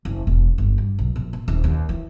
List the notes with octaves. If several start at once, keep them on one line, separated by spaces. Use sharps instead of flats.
F#1
E1
G1
G2
B1
A#1
A#2
D#1
D#2
E3